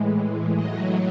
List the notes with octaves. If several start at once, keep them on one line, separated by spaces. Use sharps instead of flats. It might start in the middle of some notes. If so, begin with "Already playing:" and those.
Already playing: A2 E3 G#3
A2 F#3 D#5